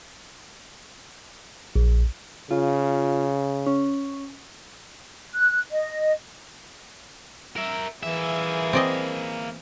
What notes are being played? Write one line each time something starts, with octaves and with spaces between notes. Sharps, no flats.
A#1
C#3 F4
C#4
F#6
D#5
A#4 E5
E3 A#3 G#4 E5
C4 D5 D#5